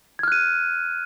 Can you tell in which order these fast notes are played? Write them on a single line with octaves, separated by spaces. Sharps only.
G#6 F6 F#6 D#7